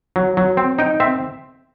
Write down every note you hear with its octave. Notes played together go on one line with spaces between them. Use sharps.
F#3
F#3
C4
D#4 G5
C4 E5